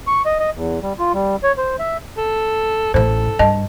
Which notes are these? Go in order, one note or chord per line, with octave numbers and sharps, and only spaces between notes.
C#6
D#5
D#5
E2
G3
F4
G3
C#5
C5
E5
A4
A1 A2 A4 C5
G2 D#5 A5